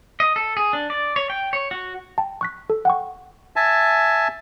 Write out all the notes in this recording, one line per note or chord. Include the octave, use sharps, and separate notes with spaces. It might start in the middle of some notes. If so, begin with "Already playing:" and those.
D#5
A4
G#4
D4
D5
C#5
G5
C#5
F#4
G5 A5
C#6 F#6 B6
A4
F#5 G5 C#6
E5 G#5 A5